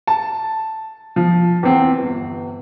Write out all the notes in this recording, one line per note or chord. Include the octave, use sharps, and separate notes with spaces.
A5
F3
E2 C4
G1